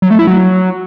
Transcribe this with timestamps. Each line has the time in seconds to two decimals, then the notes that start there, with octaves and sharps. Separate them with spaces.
0.02 F#3
0.11 A3
0.19 E4
0.27 F#3